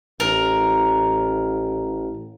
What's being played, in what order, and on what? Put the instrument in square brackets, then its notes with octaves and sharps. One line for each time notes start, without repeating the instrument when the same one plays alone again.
[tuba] A1 [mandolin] A#4